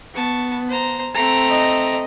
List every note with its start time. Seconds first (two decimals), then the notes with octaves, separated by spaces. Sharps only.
0.14 B3 A5 C#6
0.69 C5 A#5
1.15 A3 C4 A#5
1.50 D#5